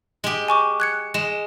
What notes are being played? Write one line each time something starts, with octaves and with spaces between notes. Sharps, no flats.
G#3 G4
G#5 C#6 D6
F#6 G#6 C#7
G#3 E7